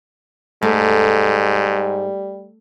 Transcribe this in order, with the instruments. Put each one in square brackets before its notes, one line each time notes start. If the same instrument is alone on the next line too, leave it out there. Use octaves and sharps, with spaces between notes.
[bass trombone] G#2 [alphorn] G3 [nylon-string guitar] A3